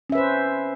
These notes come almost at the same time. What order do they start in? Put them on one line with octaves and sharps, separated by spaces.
C#4 E5 B4 C5